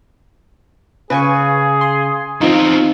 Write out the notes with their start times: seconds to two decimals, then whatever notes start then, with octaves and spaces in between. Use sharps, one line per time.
1.10 C#3 G#4 B4 G#5 C#6
1.81 C6
2.41 E2 C4 D#4 F4